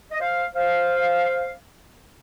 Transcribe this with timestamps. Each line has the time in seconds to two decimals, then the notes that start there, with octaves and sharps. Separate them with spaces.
0.12 D#5
0.20 C5 F5
0.55 C5 F5